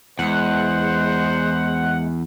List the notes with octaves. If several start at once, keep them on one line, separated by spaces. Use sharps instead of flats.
E2 G#3 C5 F#5